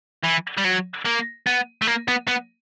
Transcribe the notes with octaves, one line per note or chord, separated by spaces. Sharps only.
E3
G3
F#3
A#3
B3
A3
A#3
B3
B3